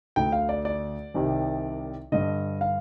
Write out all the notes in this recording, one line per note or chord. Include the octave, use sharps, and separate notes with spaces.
D2 D3 G5
F5
D5
D5
C2 C3 D#3
G2 D3 D#5
F5